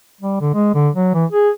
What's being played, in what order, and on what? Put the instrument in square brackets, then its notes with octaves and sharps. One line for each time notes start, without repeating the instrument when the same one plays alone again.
[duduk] G3
D3
G#3
D3
F#3
E3
G#4